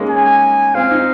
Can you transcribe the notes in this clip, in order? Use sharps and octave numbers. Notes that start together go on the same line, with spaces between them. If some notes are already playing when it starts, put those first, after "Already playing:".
Already playing: G#3 A#3 C#4 D#4
G#5
C4 F5
D#4